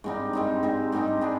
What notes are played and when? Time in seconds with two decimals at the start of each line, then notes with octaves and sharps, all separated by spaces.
0.04 G#2 G3 C4 D#4
0.33 G#2 G3 C4 D#4
0.63 G#2 G3 C4 D#4
0.92 G#2 G3 C4 D#4
1.21 G3 D4 G#4